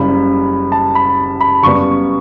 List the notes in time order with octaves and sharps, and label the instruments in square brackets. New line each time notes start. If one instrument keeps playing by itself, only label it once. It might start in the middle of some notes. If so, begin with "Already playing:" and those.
Already playing: [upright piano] F#1 F#2 C#3 G3 [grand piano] B5
[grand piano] A5
B5
B5
[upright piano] F#2 C#3 G3 B3 [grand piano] C#6